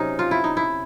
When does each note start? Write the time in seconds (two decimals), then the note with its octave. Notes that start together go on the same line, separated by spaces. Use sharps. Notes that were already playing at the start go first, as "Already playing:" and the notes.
Already playing: C3 F#3 C#4 D#4
0.19 F4
0.31 E4
0.44 D#4
0.57 E4